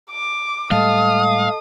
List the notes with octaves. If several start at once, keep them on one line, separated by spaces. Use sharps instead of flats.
D6
A2 G3 G#3 A4 D#5 F5 A5 D#6